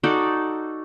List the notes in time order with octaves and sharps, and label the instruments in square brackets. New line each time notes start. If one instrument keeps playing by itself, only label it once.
[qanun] D#4 F#4 A4 D5